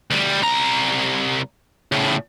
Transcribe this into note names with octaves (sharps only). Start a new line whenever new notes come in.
D2 G3
C2 A#5
A2 C#3